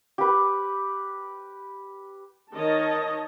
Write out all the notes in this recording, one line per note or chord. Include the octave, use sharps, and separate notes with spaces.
G4 B4
D#3 C#5 D#5 A5